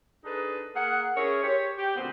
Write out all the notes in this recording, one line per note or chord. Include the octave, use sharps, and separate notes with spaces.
D4 D#4 G#4 A4 B4
A#3 G#4 F#5
C#4 E4 G#4 A#4 C#5
G4 C5 C#5
G4
D2 A#2 B3 C4 C5